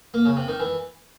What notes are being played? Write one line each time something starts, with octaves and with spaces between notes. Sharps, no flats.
A#3
C#3
C3
D#3
E3